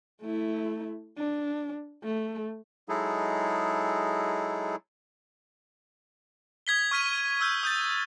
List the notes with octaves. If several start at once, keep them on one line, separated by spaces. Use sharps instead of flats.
A3 E4
D4
A3
F#3 G#3 D#4 E4 G#4 A4
D#6 G#6 B6 G7
C#6 F6 B6 D#7
E6 F6 G6
D#6 G6 A6